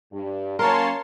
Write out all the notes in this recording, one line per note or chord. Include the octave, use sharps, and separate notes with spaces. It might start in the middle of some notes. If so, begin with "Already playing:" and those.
G2
F#3 A#3 C#4 A#4 C#5 A5 C6